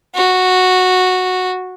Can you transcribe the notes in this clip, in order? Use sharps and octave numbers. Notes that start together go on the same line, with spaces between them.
F#4